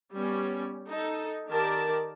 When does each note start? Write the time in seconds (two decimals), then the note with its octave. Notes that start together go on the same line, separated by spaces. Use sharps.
0.13 G3 B3 C#4
0.88 D#4 A4
1.48 D#3 G4 A#4 D5 A5